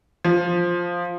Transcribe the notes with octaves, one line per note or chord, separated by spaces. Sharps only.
F3